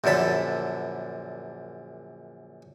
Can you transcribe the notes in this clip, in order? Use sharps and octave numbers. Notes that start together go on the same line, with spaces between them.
A#1 F#2 D3 A4 B5